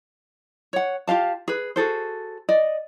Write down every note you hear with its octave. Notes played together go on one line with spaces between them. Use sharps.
C#5 F#5
F4 G4 F5 A5
G#4 B4
F#4 G#4 A4 C5
D5 D#5